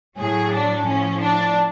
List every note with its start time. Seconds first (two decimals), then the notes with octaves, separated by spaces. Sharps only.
0.18 A2 F#3 G#4
0.52 D4
0.85 A2 F3 C#4
1.20 D4